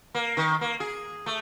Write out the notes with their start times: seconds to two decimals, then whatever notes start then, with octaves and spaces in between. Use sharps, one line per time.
0.14 A#3
0.37 D#3
0.61 A#3
0.80 G#4
1.26 A3